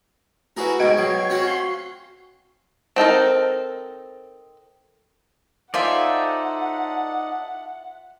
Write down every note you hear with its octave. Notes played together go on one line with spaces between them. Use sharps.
A3 E4 F#4 G#4 A#4 B4
G#2 B2 D#5 G5 G#6
F#3 C#6 C7
C4 C#4 F#4
F5 C6
C4 D#4 A4 A#4
D#4 F4 A4 C5 D5 E5 F#5 G#5